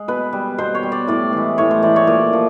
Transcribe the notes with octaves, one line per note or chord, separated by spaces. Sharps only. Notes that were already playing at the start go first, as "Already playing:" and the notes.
Already playing: G#3
B2 B4
G3
B2 C5
C#5
G3
D5
A2 D5
E3 G#3
A2 C#5
C5
E3 G#3 D5
C#5
A#2 D5
F3